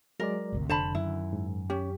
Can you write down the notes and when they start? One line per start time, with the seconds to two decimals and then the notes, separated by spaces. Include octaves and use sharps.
0.20 F#3 G#3 A#4 D5
0.52 G#1 D2 C3
0.69 F1 D3 C5 A5 B5
0.95 F#2 D#3 E4
1.33 G#2
1.70 C#4 G4